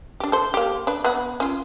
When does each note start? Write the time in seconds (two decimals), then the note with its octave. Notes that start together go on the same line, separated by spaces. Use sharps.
0.20 D4 G4
0.32 A4 C5
0.54 A#3 G4
0.87 D4 B4
1.05 B3 B4 F#5
1.40 C#4 F4